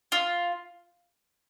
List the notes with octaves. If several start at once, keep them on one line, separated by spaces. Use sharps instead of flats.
F4